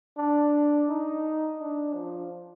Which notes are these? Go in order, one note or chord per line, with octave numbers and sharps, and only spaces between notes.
D4
D#4
D4
F3